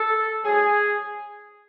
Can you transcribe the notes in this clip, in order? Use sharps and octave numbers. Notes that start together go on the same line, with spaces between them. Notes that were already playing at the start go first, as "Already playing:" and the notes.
Already playing: A4
G#2 F#3 G#4